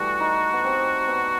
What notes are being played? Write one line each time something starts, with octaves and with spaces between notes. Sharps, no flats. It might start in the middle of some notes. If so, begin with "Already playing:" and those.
Already playing: E3 G3 A3 F#4
D#4
B3
C4
B3